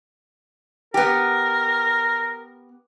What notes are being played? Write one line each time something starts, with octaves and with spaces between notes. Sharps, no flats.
B3 G4 A#4